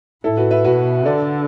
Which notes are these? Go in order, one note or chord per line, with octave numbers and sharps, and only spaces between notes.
A2 E4 A4
F#4 B4
B4 E5
B2 F#4 B4
D3 A4 D5